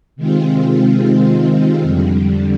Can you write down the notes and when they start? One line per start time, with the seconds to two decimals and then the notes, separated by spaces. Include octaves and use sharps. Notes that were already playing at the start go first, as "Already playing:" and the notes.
0.16 C3 D#3 G#3 C4 F4
1.82 F2 D3 G3